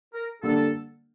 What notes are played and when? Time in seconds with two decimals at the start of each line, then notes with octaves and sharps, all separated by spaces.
0.14 A#4
0.43 D3 G3 A#3 D4 A4